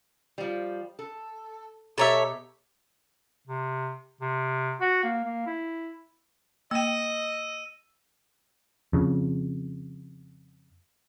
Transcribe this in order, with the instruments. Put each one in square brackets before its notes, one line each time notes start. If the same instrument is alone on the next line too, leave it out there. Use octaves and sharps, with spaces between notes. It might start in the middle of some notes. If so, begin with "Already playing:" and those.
[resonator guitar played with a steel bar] F3 G3
A4
[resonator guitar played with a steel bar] B2 G4 A#5 [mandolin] A4 C#5 E5
[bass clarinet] C3
C3
F#4
A#3
A#3
E4
[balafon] A#3 G5 [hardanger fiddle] D#5 [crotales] E6 D#7
[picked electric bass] F2 C#3